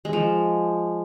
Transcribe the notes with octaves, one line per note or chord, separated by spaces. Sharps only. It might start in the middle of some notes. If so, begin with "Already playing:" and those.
G#3
F3